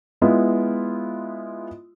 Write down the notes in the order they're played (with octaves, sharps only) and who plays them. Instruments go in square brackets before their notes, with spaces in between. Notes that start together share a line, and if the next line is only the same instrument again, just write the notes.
[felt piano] G#3 B3 E4 F4